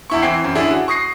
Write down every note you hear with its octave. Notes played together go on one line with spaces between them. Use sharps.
E2 E4 C#6
E3 C4 G5 C7
F#2
D3 C#4 D4 E4 G#4
F#4
C#6 D#6 A#6 C7